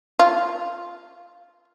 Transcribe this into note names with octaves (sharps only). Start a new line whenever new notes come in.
F4